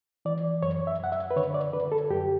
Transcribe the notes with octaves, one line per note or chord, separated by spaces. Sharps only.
E3 D5
F#2 C#5
E5
F#2 F#5
E5
B4
D3 C#5
D5
D3 B4
A4
F#2 G4